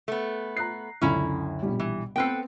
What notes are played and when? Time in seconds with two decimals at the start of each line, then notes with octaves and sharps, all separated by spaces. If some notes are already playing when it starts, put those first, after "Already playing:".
0.08 A3 B3
0.57 A#5 F#6 C7
1.01 C#2 F#2 D3 C#4 E4 A#5
1.62 A#1 B2 G3
1.80 E3
2.16 B3 C4 A4 B4 G5 C7